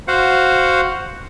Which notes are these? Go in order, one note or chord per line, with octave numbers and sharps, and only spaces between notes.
F#4 C5 F5 F#5